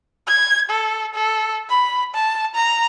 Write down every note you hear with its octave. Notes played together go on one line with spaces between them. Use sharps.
G#6
A4
A4
B5
A5
A#5